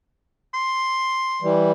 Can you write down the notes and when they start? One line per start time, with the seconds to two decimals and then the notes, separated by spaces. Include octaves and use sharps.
0.54 C6
1.42 E3 G3